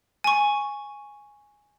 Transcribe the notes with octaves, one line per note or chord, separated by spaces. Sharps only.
G#5 C#6